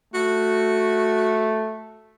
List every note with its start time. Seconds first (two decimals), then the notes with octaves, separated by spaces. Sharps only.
0.14 A3 F#4